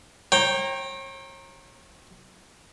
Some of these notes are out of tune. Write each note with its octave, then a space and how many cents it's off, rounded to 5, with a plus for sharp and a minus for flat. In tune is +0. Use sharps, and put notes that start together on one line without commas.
C#5 -40 G5 +0 A#5 -5